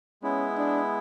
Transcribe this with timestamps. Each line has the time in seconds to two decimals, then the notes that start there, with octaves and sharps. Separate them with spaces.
0.23 G#3 B3 C#4 E4
0.57 D4